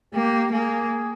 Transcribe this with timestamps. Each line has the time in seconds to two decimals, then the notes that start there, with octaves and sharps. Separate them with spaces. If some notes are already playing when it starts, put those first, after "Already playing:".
0.14 A#3 G4
0.52 A#3 G#4